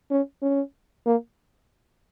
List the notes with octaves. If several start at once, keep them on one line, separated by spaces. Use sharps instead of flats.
C#4
C#4
A#3